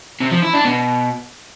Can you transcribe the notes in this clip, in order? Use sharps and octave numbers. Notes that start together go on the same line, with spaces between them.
C3
F3
E4
D4
B2